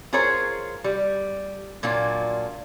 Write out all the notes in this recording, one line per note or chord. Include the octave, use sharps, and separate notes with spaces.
F4 G#4 A#4 C5 C#5
G3
A#2 F#3 A#3 D4 F4